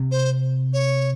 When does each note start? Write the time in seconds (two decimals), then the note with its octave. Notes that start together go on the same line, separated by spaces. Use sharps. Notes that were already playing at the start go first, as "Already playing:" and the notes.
Already playing: C3
0.11 C5
0.73 C#5